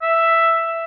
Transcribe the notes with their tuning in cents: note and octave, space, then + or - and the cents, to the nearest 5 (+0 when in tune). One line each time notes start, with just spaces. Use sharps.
E5 +5